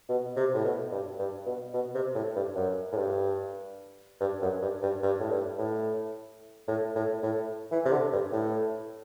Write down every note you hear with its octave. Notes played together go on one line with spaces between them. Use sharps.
B2
C3
A2
B2
G2
G2
B2
B2
C3
A2
G2
F#2
A2
G2
G2
F#2
G2
G2
G2
A2
G2
A2
A2
A2
A2
E3
C3
D3
G2
A2